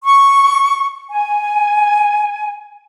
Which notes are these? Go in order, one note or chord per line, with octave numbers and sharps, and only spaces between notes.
C#6
G#5